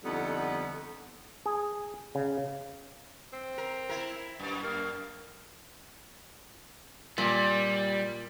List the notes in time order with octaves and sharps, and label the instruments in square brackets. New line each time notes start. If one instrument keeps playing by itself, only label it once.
[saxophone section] F2 D3 G3 B3 D#4 A4
[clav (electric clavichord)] G#4
C#3
[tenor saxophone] C4
[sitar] A#4
E4 A#4
F#2
[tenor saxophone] A#3
[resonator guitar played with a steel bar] A#2 [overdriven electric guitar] G3